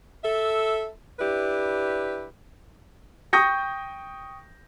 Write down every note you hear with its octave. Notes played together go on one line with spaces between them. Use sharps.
A4 E5
D4 E4 G4 B4
G5 C#6 D#6 G6 A#6 C#7